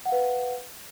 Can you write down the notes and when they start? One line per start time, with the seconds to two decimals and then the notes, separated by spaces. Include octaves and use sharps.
0.06 F#5
0.09 F5
0.12 B4